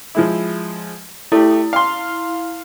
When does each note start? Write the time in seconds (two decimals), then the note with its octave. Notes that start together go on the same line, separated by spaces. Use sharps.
0.15 F3 G#3 E4
1.32 A3 E4 G4
1.73 F5 C6